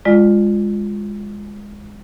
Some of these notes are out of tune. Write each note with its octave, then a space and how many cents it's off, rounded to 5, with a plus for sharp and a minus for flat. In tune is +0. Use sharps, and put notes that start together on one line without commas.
G#3 -15 F4 +0 D5 +35